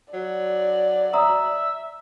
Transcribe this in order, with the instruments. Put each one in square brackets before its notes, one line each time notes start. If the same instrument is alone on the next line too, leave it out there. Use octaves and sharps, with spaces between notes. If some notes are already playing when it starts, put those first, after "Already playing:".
[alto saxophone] F#3 [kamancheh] D5
[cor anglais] E5 [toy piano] A#5 D#6